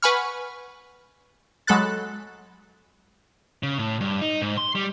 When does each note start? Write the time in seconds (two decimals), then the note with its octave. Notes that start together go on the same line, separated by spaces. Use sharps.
0.02 B4 F#5 G#5 B5 C#6 F6
1.67 F#3 G#3 A4 B5 F#6 A6
3.63 C#3
3.78 A2
4.01 G2
4.22 D#4
4.42 G#2
4.58 C6
4.76 G3